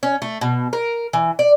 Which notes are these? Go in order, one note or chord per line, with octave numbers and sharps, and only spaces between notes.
C#4
A3
B2
A#4
E3
D5